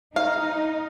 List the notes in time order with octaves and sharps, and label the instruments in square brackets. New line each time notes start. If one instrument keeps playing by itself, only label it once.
[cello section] D#4 [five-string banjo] F5